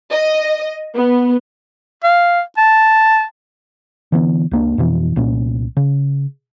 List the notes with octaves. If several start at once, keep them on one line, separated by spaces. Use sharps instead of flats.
D#5
B3
F5
A5
D3 E3 B3
C#2 A#3 D4
F2 B2 E3
C2 A#2 C#4
C#3